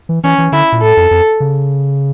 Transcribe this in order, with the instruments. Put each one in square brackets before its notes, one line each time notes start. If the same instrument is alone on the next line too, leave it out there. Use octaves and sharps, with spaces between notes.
[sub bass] E3
[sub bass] E3 [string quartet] C#4
[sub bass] E3
[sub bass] D3 [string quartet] E4
[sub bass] A#2
[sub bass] A2 [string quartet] A4
[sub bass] F2
F2
C#3